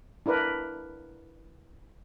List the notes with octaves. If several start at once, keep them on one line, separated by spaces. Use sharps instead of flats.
D4 E4 A#4 B4